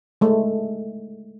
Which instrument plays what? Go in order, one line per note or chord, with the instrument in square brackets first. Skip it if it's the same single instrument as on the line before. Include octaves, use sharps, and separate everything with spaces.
[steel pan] G#3 A3